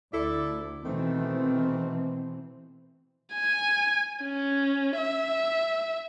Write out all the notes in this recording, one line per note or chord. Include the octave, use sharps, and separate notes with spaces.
D2 E4 A4 D5
B2 D#3 E3 A3 C4
G#5
C#4
E5